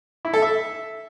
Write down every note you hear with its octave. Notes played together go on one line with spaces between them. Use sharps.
E4
A4
E5